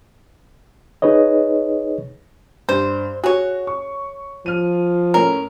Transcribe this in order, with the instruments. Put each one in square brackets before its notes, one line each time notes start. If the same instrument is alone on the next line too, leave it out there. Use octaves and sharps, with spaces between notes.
[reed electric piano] D#4 G#4 B4 C#5 D#5
[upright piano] G2 [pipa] C5
[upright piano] F#4 [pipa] G#4 C#5
[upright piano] C#6
[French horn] F3 [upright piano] F6 D#7
[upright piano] A2 C#4 [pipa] A#4